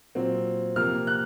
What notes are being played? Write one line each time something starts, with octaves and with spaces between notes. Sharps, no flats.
A#2 F#3 C4
C3 F3 A#3 F6
F#6